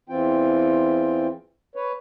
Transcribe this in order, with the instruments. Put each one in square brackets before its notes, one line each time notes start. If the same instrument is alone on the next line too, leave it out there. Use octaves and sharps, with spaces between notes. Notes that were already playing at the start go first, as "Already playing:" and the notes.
[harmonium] E2 E3 C4 F4 G5
B4 C#5